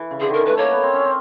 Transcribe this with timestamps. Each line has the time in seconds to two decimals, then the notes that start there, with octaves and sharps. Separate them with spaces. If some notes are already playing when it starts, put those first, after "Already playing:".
Already playing: E3
0.11 C#3
0.20 D3 G#4
0.30 D#3 A#4
0.40 E3
0.46 A3 B4
0.58 A#3 C#5
0.71 B3
0.83 C4
0.94 C#4
1.05 C4